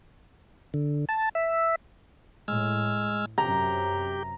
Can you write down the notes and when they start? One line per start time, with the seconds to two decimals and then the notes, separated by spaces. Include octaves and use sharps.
0.74 D3
1.09 A5
1.35 E5
2.48 A2 G#3 E6 F6
3.38 F#2 C3 G4 A#5